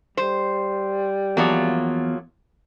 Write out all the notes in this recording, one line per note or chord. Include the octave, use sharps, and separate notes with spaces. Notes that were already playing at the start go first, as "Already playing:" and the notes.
G3 C5
E2 F3 F#3 A#3